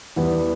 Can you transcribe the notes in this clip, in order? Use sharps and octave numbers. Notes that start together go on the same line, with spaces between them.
E2 E3 G3 B3